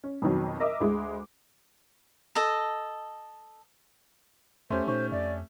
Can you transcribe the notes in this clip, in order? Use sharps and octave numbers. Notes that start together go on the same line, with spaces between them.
C#4
F2 B2 D#3 F#3
A#4 D#5 E5 D6
D2 G#3 G#4
A4 D#5 A5
E2 A3 C#4 G4 C5 E5 C6
A#2 D#4 C5 C#6
F2 D5 E5